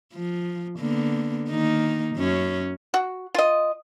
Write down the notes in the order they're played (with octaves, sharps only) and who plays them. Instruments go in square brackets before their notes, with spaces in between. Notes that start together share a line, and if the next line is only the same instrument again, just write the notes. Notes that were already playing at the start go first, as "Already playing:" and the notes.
[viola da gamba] F3
D3 A#3 B3
D#3 A#3 D#4
F#2 C#4
[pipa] F#4
F4 D#5